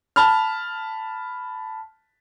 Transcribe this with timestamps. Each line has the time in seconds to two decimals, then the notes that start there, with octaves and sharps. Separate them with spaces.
0.16 A5 B5 F6